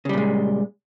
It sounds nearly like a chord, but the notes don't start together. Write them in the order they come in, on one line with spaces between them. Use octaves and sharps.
C#3 G3 A#2 G#3